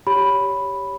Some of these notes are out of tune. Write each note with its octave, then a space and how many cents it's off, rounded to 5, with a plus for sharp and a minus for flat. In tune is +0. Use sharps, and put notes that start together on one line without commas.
G4 +0 C#5 +10 B5 +0